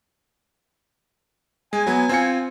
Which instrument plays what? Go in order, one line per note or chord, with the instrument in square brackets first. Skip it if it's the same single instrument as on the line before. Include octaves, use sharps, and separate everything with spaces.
[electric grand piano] G#3 [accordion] G#5
[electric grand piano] F#3 B3
C4 F4 C#7